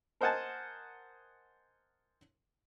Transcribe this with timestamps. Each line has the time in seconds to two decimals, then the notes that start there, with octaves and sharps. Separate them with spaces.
0.21 A#4 C5 D#5 F#5 G#5 A5